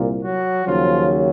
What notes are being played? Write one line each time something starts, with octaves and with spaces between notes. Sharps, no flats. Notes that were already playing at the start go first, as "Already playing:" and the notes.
Already playing: C2 A#2
F#3 F#4
D#2 C#3 F3 F#3 F4